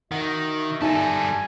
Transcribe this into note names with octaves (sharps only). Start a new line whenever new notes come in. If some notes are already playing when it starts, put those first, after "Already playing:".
D#3 F#4 D#5 E5 F#5
G3 D#4 A4 E5 G#5 A5